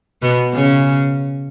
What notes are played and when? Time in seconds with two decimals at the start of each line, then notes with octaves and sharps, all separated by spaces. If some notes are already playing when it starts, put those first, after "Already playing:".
0.22 B2 B3
0.54 C#3 C#4